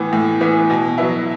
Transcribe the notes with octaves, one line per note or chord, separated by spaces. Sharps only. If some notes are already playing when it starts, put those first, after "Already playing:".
Already playing: A2 E3 B3
A2
E3 B3
B2
F#3 B3 E4